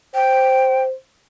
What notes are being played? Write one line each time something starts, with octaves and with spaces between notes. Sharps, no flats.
C5 G5